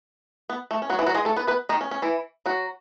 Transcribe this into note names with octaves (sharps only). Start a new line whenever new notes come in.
B3
A3
C#4
F#3 F#4
E3 E4
F#3 F#4
G#3 G#4
A3 A4
B3 B4
B3 B4
D#3 D#4
C#4
C#4
E3 E4
F#3 F#4